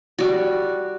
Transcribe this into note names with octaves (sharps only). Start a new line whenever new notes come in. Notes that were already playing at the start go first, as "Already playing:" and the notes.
G3 F#4